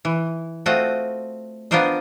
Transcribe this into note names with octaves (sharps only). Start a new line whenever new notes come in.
E3
A3 C4 F4 F#4 D#5
B3 D4 F4 A#4 C5 D#5